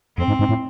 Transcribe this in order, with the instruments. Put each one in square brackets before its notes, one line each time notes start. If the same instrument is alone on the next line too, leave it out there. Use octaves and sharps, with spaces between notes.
[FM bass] F2 [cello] C4
[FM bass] G#2
G#2
A2